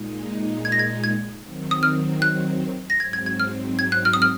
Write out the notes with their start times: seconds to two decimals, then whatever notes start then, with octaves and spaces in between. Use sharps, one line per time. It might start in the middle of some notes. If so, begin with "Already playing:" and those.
Already playing: A#2 G#3 D#4
0.65 G#6
0.72 A#6
0.79 G#6
1.04 G#6
1.43 D#3 F#3 C4
1.71 D#6
1.83 F6
2.22 F#6
2.90 A#6
3.00 G#2 F#3 C4 G#6
3.13 G#6
3.26 G#6
3.40 F6
3.79 G#6
3.92 F#6
4.05 F6
4.13 D#6
4.22 F6